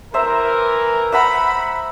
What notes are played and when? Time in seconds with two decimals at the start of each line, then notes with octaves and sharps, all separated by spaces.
0.14 E3 A#4 C5 E5 A#5
1.12 E5 F#5 A#5 B5